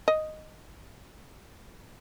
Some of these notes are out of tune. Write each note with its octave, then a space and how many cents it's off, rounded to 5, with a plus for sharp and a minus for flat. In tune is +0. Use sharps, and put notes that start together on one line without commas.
D#5 -5